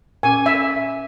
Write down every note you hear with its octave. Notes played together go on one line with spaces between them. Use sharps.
A#2 C#4 G#5 D6
E5